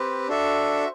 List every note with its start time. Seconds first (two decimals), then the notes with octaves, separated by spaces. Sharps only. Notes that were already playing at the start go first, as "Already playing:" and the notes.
Already playing: C4 G4 B4 C5
0.28 D4 F#4 A4 E5